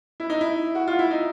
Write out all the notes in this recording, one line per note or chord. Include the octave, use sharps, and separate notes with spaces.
E4
D#4
E4
F#4
F4
E4
D#4